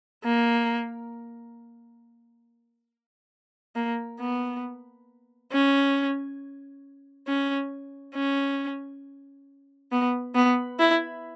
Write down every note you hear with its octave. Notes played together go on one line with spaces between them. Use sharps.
A#3
A#3
B3
C#4
C#4
C#4
B3
B3
E4